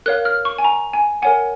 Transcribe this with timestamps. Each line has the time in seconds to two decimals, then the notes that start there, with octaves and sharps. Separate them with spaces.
0.06 A#4 C#5 F5 F#6
0.25 F6
0.45 C#6
0.58 G#5
0.64 A#5
0.93 G#5
1.22 A#4 C#5 F#5 G#5